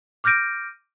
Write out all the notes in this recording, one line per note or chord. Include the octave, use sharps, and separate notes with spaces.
D6 F6 G6 A#6 D7 D#7